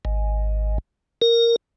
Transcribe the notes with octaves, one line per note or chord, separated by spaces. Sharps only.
G#1
A#4